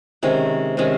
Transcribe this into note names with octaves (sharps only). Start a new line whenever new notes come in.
C3 D#3 G#3 C#4
C3 D#3 G#3 C#4